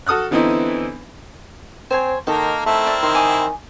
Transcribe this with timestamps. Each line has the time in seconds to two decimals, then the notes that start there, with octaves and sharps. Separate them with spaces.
0.07 F#4 A4 D#6 F6 F#6
0.31 D3 E3 B3 C4 D#4 E4
1.91 C4 C5 C#5 G#5
2.27 D#3 A#3 D#4 A4 A#4
2.66 A3 C4 E4 A#4
2.87 D5
3.03 D#3 C6
3.15 G#5 D6 D#6